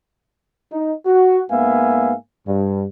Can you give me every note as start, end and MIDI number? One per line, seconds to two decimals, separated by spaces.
0.72 0.93 63
1.06 1.41 66
1.51 2.14 44
1.51 2.14 58
1.51 2.14 59
1.51 2.14 76
1.51 2.14 77
1.51 2.14 80
2.48 2.85 43